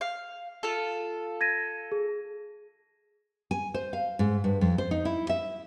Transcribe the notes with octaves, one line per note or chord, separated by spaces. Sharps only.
F5
F4 A4
G#6 A#6 D#7
G#4
G#5
C5
F5
G#2
G2
F2
C5
D#4
E4
E5